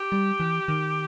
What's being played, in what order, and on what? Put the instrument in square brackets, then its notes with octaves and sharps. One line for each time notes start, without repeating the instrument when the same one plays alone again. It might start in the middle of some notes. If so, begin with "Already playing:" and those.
Already playing: [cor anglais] G4
[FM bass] G3
E3
D#3